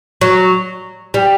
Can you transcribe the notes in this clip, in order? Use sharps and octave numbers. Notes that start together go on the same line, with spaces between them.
F#3
G3